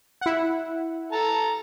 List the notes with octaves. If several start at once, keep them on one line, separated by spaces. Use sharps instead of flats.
E4 F#5
A4 A5 A#5